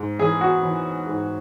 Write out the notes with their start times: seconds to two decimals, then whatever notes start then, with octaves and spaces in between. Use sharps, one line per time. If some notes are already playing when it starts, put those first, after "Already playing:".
Already playing: G#2
0.19 E3 G#4
0.41 F#4
0.63 E3
1.07 G#2